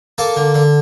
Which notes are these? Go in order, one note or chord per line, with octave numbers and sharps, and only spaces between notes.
A#3 A4
D3
D3